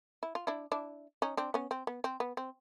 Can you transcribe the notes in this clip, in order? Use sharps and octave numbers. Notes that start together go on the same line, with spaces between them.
E4
F4
D4 E4
D4 E4
C#4 D#4
C4 D4
B3 C#4
C4
B3
C4
B3
C4